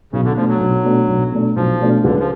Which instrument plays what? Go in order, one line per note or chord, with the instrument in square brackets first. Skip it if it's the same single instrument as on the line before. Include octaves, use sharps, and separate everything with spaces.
[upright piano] B1 [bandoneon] C#3
[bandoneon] D3
[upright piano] B2 A3 D4 [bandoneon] F3
[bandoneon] F#3
[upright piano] B1
B2 A3 D4
B1
B2 A3 D4
[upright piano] B1 [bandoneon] F3
[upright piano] B2 A3 D4
[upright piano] C#2 [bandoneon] D3
[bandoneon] F3